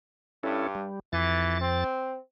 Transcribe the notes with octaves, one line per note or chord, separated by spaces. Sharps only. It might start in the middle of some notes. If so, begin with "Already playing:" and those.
G2 C#4 E4 A4
G3
F2 E3 A6
C4